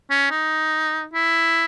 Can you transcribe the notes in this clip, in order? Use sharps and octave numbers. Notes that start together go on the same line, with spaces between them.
C#4
D#4
E4